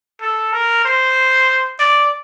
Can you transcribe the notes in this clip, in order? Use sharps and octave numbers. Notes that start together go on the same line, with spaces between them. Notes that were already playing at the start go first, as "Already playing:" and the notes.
A4
A#4
C5
D5